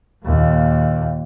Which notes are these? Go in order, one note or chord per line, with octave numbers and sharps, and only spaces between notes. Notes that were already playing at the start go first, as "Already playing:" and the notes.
D#2 A#2